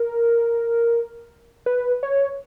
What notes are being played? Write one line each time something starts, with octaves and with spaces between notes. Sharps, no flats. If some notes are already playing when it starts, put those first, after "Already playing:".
Already playing: A#4
B4
C#5